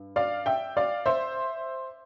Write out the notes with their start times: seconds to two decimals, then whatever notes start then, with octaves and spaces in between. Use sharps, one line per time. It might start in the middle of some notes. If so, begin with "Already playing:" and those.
Already playing: G2
0.16 D5 F5
0.46 E5 G5
0.77 D5 F5
1.06 C5 E5